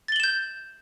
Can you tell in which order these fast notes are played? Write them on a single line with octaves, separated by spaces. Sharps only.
A6 G7 F#7 E7 G6